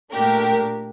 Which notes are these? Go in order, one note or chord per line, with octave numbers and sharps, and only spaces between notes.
A#2 A3 D4 G4 A#4